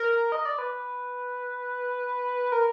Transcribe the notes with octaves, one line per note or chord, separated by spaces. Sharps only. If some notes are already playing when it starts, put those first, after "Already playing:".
Already playing: A#4
D#5
D5
B4
A#4